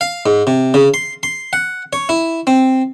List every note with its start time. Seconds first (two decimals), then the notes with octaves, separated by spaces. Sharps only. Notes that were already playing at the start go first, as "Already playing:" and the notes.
0.01 F5
0.26 G#2
0.47 C3
0.74 C#3
0.94 C6
1.23 C6
1.53 F#5
1.93 C#5
2.09 E4
2.47 C4